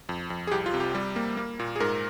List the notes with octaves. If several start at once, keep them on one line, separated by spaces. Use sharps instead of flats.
F2
F2
G#4
C2 G4
F4
C3
G4
G3
A#3
A#3
A#2
G#4
G#2 A#4